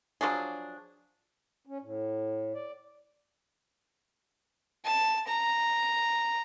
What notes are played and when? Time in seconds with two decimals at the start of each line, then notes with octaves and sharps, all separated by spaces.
0.21 F3 F#3 D4 G#4
1.66 C#4
1.82 A2
2.54 D5
4.85 A5
5.27 A#5